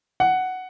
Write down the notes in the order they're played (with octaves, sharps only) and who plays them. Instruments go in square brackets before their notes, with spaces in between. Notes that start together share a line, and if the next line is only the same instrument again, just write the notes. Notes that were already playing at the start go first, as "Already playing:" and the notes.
[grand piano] F#5